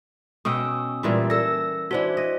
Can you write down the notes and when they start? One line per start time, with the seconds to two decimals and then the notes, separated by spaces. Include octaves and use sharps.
0.45 B2 C#4 G5 D#6 E6
1.03 A#2 E3 G3
1.30 A4 A#4 E6 A#6
1.91 E3 D4 F#4 C5 D5
2.17 D#5